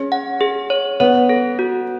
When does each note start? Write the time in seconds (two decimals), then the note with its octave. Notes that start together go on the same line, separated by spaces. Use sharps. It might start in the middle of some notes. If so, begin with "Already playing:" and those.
Already playing: C#4 G#4
0.12 F#5
0.41 G#4
0.70 C#5
1.00 B3 C#5
1.29 A4
1.59 F#4